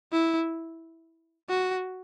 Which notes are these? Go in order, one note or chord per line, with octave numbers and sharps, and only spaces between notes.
E4
F#4